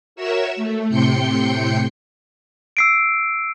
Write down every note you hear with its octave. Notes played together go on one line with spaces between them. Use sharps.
F#4 A#4 C#5 E5 E6
A3
A2 C3 G5 C6 G6 C#7
E6 C7 D7